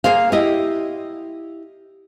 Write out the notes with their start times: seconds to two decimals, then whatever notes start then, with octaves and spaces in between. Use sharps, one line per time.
0.04 A#3 G#4 C5 F5
0.32 E4 G4 D#5